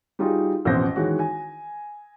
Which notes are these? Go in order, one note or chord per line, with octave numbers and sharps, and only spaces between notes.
G3 D#4 F4 F#4 G#4
A1 F2 B2 C5 A#6
D#3 E3 G#3 F#4 C#5
G#5